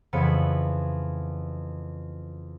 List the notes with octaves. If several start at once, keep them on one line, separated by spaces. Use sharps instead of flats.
F2 C#3 E3 B3 B5 C#7